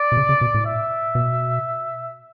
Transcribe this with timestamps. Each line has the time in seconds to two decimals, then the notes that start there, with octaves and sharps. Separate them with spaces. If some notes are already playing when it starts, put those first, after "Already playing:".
Already playing: D5
0.12 B2
0.17 C#3
0.29 C#3
0.41 B2
0.54 A2
0.66 E5
1.15 B2